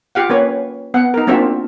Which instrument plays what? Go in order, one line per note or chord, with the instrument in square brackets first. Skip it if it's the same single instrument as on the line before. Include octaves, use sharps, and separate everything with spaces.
[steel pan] F4 G4 F5 F#5
A#3 C#4 B4 C#5
B3 F#5
D#4 A#4
A#3 C4 D4 F4 F#4 E5